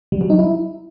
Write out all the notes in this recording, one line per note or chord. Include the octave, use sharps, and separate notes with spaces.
G3
F#3
D#4
E4